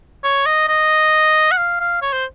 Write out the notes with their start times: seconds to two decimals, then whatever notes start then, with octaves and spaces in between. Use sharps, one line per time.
0.24 C#5
0.46 D#5
0.68 D#5
1.51 F#5
1.57 F5
1.80 F5
2.02 C#5
2.13 C5